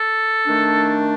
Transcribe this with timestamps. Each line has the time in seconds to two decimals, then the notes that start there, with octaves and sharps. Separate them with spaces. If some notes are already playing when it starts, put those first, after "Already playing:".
Already playing: A4
0.46 D#3 A3 D4